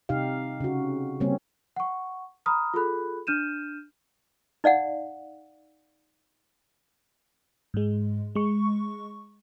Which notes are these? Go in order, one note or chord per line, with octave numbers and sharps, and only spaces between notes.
C3 D#4 G4 F5
C#3 F#4
C#3 G3 A#3 C4 C#4
F#5 C#6
A#5 B5 D#6 F6
F4 G#4 A4 B5 F#6
D4 F6 G6 D#7 E7
D#4 D5 F5 F#5
G#2 G#3
G#3 C#6